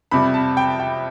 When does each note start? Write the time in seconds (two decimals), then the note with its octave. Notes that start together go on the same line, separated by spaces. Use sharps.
0.11 F2 C3 G3 B5
0.34 A5
0.57 G5
0.80 G5